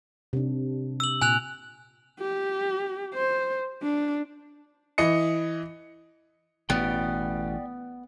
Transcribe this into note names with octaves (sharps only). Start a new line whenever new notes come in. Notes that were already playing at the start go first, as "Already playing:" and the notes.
C3 D4
E6 F#7
A#2 G#5 F#6 F7
G4
C5
D4
E3 D#5 C#7
A1 B2 B3 D5 G5